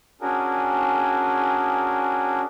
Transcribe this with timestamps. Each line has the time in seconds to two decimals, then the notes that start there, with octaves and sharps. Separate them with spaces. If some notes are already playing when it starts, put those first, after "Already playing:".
0.21 C#4 D4 F#4 G#4 A#4